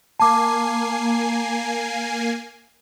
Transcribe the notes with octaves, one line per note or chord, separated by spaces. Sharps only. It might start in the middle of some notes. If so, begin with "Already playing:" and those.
A#3 G#5 A5 D6 C7